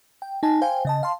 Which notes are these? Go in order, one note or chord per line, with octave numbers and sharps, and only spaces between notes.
G5
D#4 G#5 A5
C5 F5 G5 G#5
C#3 D#5 A5
F5 A5 C6